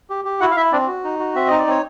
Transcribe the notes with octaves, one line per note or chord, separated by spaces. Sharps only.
G4
G4
E4 F#4 F#5
F5
E4 E5
C4 D4 D5
F#4
D#4
F#4
C4 E5
D#4 D#5
D5
C4 C#5